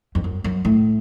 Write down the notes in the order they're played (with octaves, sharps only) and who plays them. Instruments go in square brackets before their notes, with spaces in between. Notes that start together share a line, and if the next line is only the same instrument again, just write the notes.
[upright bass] F2
F#2
F#2
A2